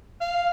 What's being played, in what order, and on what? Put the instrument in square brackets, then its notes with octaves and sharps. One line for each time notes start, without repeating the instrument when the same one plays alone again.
[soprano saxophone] F5